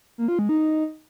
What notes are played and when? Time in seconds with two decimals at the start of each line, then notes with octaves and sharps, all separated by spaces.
0.18 A#3
0.28 F4
0.39 G#3
0.49 D#4